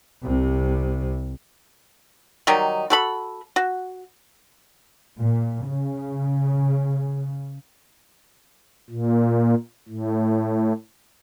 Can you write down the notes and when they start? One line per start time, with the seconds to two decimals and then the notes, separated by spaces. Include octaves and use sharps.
0.22 C2 C3
2.47 D#3 F#3 G3 D#4
2.90 F#4 A4 B5
3.56 F#4
5.19 A#2
5.67 C#3
8.90 A#2
9.89 A2